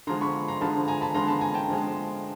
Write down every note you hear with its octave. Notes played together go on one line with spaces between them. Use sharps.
D3 F3 G#3 A#5 C6
B5 C#6
A#5 C6
D3 F3 G#3 A5 B5
G#5 A#5
A5 B5
D3 F3 G#3 A#5 C6
A5 B5
G#5 A#5
G5 A5
D3 F3 G#3